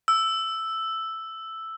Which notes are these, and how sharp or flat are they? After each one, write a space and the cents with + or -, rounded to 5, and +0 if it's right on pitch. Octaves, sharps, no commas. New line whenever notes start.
E6 +0